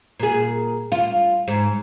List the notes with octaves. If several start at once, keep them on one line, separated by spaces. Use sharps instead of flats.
A#2 G#4
F4
G#2